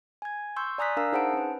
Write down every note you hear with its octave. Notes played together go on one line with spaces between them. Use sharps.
G#5 G#6
C6 C#6 E6 G6
D5 G#5 A#5 D#6 F#6 B6
D4 A#4 F5 A#5 E6
D#4 G#4 C5 F#5 A5 D7
C#4 B4